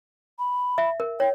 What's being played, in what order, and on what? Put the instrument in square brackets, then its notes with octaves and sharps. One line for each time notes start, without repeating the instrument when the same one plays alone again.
[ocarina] B5
[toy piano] E5
A#4
[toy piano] C#5 [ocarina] G5